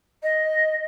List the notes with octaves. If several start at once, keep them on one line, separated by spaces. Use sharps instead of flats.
D#5